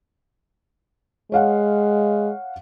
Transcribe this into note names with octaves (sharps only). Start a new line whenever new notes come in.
G#3 C#5 F5 F#5